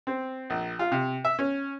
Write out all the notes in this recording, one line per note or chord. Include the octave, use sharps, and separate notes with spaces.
C4
A#1
F4
C3
E5
C#4